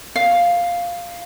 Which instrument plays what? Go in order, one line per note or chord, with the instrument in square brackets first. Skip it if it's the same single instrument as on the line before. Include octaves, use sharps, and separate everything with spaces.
[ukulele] F5